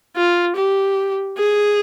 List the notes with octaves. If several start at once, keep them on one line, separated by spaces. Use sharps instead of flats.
F4
G4
G#4